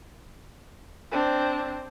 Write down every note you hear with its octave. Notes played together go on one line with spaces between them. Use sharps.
C4 D4